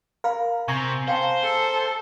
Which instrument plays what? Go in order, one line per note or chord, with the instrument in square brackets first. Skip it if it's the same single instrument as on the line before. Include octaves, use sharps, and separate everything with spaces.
[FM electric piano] A#4 [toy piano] F5 B5
[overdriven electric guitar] C3 [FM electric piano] G#5 A#5 [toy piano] C#6
[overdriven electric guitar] C5 [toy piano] F5 G5 A5
[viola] A4